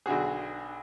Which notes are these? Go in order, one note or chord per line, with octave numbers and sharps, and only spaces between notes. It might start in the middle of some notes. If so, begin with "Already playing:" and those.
B1 D3 F#4 G#4